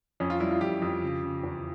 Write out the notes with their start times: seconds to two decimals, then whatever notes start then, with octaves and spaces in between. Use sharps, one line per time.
0.20 F2 C#4
0.30 F4
0.40 G3 E4
0.51 F4
0.61 F2 G4
0.82 F2
1.03 C#3
1.23 C#3
1.44 E2